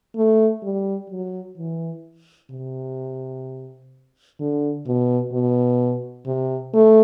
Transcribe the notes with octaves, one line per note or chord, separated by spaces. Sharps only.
A3
G3
F#3
E3
C3
D3
B2
B2
C3
A3